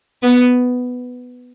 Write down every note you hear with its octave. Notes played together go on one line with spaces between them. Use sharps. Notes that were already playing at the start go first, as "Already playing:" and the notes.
B3